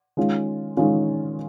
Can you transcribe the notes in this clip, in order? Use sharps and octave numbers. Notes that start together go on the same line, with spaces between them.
D#3 G#3 C#4 F4
D#3 G#3 C#4 F4